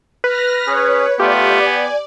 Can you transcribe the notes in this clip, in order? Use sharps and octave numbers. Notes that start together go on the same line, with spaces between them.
B4 F6 A#6
C#4 G#4 C#5
A3 B3 F4 G4 D5
G#5